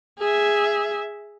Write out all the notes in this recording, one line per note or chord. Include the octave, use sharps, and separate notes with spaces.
G#4 E5